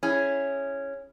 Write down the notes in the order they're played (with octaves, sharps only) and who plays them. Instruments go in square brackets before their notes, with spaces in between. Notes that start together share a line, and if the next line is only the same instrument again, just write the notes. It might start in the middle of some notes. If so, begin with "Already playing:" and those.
[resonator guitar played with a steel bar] C#4 E4 G#4